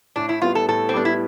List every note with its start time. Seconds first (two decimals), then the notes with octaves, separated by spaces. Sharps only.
0.16 A2 D4
0.29 E4
0.42 G3 B3 F4
0.55 A4
0.68 A2 A4
0.89 C4
0.94 G3 B3 D4
1.05 E4